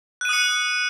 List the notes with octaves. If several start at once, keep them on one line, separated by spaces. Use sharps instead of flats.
D#6 F#6 C#7 D#7